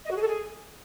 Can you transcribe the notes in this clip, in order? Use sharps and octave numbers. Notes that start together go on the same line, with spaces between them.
D#5
F#4
G#4
A4
G#4